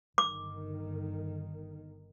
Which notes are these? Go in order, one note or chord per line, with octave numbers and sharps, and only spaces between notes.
G1 D#3 D6